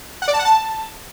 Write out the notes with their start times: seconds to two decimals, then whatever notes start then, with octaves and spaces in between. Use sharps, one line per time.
0.22 F#5
0.28 D5
0.33 A5
0.39 F#5
0.45 A5